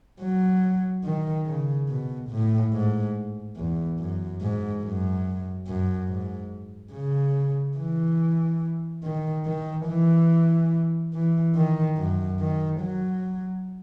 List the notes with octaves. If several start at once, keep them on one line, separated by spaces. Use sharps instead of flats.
F#3
D#3
C#3
B2
A2
G#2
E2
F#2
G#2
F#2
F#2
G#2
C#3
E3
D#3
D#3
E3
E3
D#3
F#2
D#3
F#3